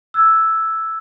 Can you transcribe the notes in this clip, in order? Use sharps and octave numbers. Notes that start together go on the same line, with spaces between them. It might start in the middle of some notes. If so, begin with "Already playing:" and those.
E6 F#6 G#6